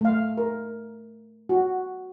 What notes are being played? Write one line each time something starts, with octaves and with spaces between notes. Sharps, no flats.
A3 F5
A#4
F#4